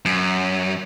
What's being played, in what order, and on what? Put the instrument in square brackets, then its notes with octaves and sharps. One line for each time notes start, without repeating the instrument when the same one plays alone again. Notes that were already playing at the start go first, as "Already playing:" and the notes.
[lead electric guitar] F#2